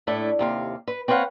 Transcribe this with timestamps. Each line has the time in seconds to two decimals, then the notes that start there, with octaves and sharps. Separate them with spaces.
0.07 A2 A3 D4 E4
0.39 D#2 C3 F5
0.88 B4
1.08 C4 B4 C#5 D5 F5 F#5